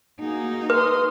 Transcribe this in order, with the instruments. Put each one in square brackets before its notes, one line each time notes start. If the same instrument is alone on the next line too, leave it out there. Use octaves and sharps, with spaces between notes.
[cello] A#3 D#4 [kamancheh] F#4 G#4
[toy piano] B4 [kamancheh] C6 D#6